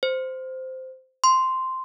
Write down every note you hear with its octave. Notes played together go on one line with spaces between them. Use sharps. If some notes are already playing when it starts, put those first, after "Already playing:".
C5
C6